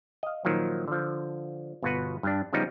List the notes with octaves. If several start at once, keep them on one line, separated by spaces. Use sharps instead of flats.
D#5 F5
A#2 D#3 F3 F#3
D3 F3
G1 B2 F4 F#4 B4
G2 D4
C#3 F3 G3 B3 D#4